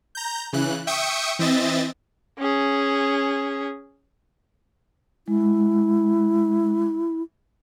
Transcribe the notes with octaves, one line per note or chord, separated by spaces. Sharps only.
A#5 G6
C#3 E3 F#6
E5 G5 C#6 D#6 C#7
E3 C4 D#5 E5 A6
C#4 G#4
G#3 E4